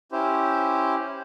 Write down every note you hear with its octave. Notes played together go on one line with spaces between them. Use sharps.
C#4 E4 G4 C5